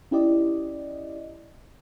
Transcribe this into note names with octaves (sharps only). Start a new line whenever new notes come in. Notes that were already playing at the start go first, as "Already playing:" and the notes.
C#4 E4 G4 D5 D#5